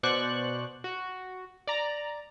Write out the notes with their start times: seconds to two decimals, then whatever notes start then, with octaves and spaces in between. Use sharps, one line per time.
0.03 B2 C5 D5 C#6 F#6
0.84 F#4
1.67 D5 A#5